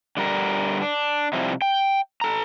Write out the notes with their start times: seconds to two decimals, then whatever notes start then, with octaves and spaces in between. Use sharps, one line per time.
0.17 D3 G3 A#4
0.82 D4
1.33 C3 F3 G3 C4 D#4 E4
1.62 G5
2.21 A4 A#5